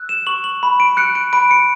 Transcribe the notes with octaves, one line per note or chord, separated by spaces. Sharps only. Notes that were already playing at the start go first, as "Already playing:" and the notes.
Already playing: E6 F#6
E7
C#6 F#7
F#7
B5
D7
F#6 C#7
D7
B5 D7
C#7